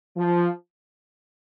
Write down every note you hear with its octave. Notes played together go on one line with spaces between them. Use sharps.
F3